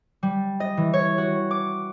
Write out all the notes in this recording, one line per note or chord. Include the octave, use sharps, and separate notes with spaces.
G3
D#5
E3
C#5
F#4
D6